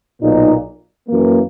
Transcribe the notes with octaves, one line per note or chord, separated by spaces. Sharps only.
B1 A#2 A#3 D#4
F#2 E3 A#3